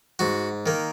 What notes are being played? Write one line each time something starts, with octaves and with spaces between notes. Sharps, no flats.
G#2 F#4
D#3 A#3